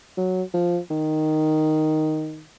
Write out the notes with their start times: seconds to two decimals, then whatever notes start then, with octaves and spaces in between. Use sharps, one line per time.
0.18 F#3
0.54 F3
0.91 D#3